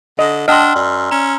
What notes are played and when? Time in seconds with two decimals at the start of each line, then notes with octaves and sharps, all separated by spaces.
0.19 D3 D#5
0.48 D4 D#5 F#5 G5 A5 C6 E6 F6
0.75 F#2 D5
1.11 C#4 A#5